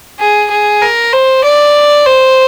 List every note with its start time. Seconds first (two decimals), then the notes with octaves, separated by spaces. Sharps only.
0.20 G#4
0.50 G#4
0.82 A#4
1.12 C5
1.44 D5
2.06 C5